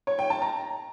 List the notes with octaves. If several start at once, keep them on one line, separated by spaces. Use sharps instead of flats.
C#5
G5
A5
A#5